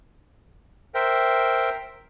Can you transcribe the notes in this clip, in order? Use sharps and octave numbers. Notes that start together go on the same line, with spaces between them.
A#4 C5 E5 G5